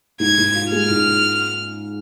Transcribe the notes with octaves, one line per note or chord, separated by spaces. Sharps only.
G#2 G#6
G#2
F4
G#3 F6
G#2